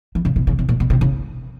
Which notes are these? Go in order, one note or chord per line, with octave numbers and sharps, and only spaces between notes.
E3
C#3
C3
C#3
C3
A#2
B2
C3
C#3